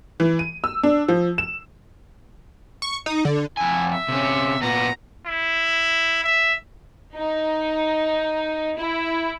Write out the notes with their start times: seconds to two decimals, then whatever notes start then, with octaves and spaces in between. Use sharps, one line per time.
0.20 E3
0.39 D#7
0.64 E6
0.83 D4
1.08 F3
1.38 E7
2.82 C#6
3.06 D#4
3.25 D3
3.57 F2 E4 G#5
3.91 E5
4.09 C3 C#4
4.62 A#2 B3 A#5
5.26 E4
6.23 E5
7.14 D#4
8.77 E4